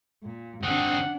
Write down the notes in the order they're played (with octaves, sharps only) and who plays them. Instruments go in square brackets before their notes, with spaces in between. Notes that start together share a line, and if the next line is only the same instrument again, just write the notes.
[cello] A#2
[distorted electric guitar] D#3 C4 [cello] D4 [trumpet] F#5